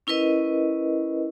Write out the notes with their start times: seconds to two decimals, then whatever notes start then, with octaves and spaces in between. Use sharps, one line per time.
0.07 C#4 E4 A#4 B4 D#5